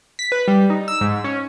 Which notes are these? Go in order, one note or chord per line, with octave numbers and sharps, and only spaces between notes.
B6
B4
G3
D#4
E6
G#2
C#4